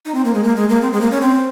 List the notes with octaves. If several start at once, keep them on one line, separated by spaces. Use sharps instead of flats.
D#4
C4
A#3
G#3
A#3
G#3
A#3
C4
G#3
A#3
C#4
C4